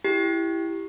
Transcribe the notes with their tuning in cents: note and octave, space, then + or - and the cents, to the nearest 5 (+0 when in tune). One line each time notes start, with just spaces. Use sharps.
E4 +10 G4 +0